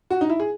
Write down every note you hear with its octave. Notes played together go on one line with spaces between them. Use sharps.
F#4
D#4
E4
G#4